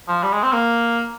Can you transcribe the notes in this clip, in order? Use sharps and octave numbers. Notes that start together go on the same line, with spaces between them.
F3
G3
G#3
C4
A#3